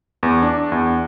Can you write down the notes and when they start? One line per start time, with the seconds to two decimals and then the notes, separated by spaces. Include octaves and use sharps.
0.23 E2
0.42 D4
0.72 E2